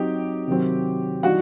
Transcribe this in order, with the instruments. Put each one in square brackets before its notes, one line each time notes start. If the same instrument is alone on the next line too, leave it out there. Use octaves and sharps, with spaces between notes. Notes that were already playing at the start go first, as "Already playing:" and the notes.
Already playing: [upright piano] F#3 C4 D#4 G4 G5
C3 D#3 F#3 C4
E3 G3 D#4 F#4 F#5